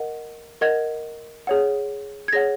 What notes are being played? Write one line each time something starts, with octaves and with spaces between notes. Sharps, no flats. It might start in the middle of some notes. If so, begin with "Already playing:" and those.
Already playing: A#4 D#5 F#5
A#4 D#5 F#5 G#6
G#4 C#5 F#5
G#6
G#4 C#5 F#5 A#6